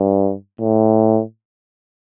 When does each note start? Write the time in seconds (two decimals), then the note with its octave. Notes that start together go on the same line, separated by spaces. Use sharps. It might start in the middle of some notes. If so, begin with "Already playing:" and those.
Already playing: G2
0.60 A2